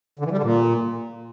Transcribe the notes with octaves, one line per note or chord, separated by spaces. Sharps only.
D3
E3
G3
D3
A#2